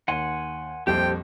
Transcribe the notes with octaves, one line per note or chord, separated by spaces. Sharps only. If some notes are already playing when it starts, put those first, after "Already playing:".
D#2 F#5 G#5 C6
A#1 F2 G3 G4 A4 C5 G5